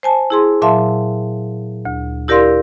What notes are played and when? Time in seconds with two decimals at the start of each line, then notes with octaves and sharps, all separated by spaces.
0.03 C5 G#5 A5
0.30 E4 G#4 C6
0.62 A#2 F#3 E5 F5 A5 C6
1.85 D2
2.28 E4 G4 A#4 D5 F5 C6